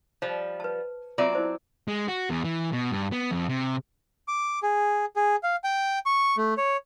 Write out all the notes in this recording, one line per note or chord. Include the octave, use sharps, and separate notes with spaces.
F3 G3 C5
B4 A5
F#3 C4 F4 D5 E5
E4 C5 A5
G#3
F#4
E2
E3
B2
G2
B3
F2
C3
D6
G#4
G#4
F5
G5
C#6
A3
C#5